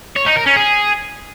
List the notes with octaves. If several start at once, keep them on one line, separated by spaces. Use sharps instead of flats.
C#5
D#4
A#4
C#4
G#4